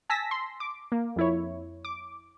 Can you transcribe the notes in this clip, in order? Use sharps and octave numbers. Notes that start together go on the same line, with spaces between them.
G#5 A5 E6 A#6 B6
C6
D6
A#3
F2 E4 C#5
D6